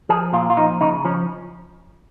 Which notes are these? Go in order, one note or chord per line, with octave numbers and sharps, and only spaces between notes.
F3 G#4
A#2 F4
F4
F3 D#4
C#3 D#4
F3 C#4